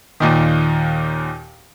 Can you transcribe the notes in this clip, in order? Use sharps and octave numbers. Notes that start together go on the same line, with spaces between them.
D#2 A#2 D#3